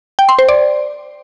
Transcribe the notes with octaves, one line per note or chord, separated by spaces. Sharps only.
G5
C6
C5
D5